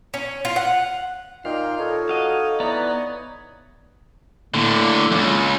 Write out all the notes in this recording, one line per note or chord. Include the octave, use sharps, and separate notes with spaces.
C#4
F4
F#5
A#2 D#4 F5 G5
D#4 A4 C#5
F#4 D#5 F5
E3 B3 D5 A#5
A2 D3 A#3
C#2 F#2